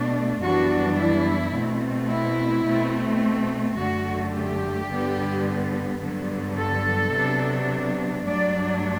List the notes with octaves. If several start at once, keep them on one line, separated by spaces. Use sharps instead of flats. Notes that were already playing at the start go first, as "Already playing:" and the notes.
Already playing: B2 A3 D4
F#2 E3 G3 B3 D4 F#4
E4
B2 A3 C4
E4
B2 A3 C4
F#2 D3 A3 F#4
G4
G2 D3 G3 B3
G2 D3 F#3 B3
A4
C3 F#3 B3 D4
G2 F#3 A3 D4 D5